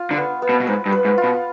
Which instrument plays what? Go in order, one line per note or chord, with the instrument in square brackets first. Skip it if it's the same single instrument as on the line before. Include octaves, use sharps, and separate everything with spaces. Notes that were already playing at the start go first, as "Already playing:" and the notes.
Already playing: [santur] F4
[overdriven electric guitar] D3
[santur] B3
B3
[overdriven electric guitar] B2
B2
[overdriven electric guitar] G#2 [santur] B4
[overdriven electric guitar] G2
[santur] B4
[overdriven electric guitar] G#2
[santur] F4
[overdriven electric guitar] B2